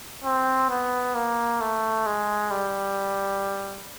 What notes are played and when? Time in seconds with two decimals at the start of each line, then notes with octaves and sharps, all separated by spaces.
0.24 C4
0.70 B3
1.15 A#3
1.61 A3
2.06 G#3
2.51 G3